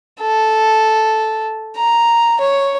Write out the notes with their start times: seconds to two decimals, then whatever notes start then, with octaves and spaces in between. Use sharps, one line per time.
0.21 A4
1.76 A#5
2.40 C#5